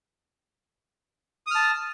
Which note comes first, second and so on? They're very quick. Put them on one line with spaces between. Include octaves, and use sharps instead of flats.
D#6 F6 A5